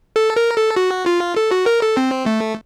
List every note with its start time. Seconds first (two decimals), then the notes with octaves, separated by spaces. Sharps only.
0.16 A4
0.36 A#4
0.56 A4
0.76 F#4
1.06 F4
1.36 A4
1.51 F#4
1.66 A#4
1.82 A4
1.97 C4
2.26 A3